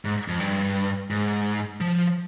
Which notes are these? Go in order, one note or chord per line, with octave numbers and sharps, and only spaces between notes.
G#2
F2
G2
G#2
F3